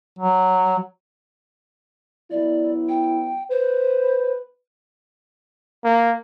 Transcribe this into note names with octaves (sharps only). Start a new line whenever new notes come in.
F#3
F#3 B3 E4 D5
G5
B4 C5
A#3